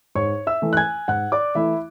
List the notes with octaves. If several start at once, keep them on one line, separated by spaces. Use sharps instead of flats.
G#2 C#5 C#6
E5 E6
E3 A3
F#6
G#5 G#6
G#2 F#5 F#6
D5 D6
E3 A3 E4 E5